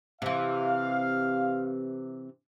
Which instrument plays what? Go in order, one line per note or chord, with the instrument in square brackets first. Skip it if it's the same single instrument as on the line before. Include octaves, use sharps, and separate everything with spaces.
[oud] C3 E3 [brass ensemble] F5